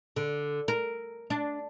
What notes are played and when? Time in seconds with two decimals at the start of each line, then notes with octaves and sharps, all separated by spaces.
0.16 D3
0.68 A#4
1.30 D4